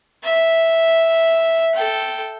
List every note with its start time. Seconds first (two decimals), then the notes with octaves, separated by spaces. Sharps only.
0.24 E5
1.75 A4 G5